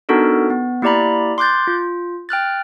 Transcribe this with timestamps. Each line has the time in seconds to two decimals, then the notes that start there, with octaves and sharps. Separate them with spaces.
0.09 B3 D4 D#4 F#4 A4 A#4
0.50 B3
0.82 A#3 E4 G4 D5 A#5 B5
1.38 C6 D6 F#6 G6 A6
1.67 F4
2.29 G5 F6 F#6 A6